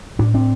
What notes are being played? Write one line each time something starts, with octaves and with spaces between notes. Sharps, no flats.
A2 D4
C4 D4